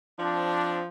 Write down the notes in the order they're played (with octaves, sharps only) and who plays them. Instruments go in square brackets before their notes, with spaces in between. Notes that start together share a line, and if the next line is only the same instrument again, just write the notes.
[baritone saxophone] F3 [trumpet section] C4 D4